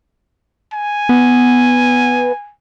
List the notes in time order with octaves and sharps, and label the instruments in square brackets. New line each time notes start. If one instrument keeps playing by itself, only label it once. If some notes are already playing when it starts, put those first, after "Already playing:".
[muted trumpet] G#5
[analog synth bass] B3